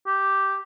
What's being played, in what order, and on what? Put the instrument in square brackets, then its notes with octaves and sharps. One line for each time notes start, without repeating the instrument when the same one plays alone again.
[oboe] G4